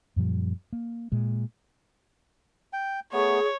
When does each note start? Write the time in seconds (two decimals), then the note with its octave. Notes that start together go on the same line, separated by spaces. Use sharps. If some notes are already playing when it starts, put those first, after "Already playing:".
0.16 F#2 A#2 F3 G3
0.73 A#3
1.12 A#2 G#3
2.73 G5
3.13 A3 B3 G#4 C#5